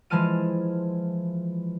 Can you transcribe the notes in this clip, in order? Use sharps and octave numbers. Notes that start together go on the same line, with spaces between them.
E3 F3 G#3 A5 F6 D#7